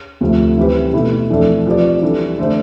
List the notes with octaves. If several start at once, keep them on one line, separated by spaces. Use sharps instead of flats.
D2 C3 F3 A3
E3 G3 C4 G4 B4
B2 A3 E4
F2 E3 A3 D4 A4
F3 C4 G4 B4 D5
E3 G3 D4 A4
D3 A3 D4 A4 C5